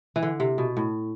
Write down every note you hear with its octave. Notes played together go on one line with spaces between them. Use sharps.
E3
D3
C3
B2
A2